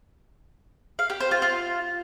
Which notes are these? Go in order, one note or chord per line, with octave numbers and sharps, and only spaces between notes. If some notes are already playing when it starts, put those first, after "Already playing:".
F5
G4
C5
F4
F4